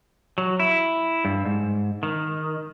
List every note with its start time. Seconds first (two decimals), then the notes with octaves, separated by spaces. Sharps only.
0.38 F#3
0.60 E4
1.25 G2
1.46 G#2
2.03 D#3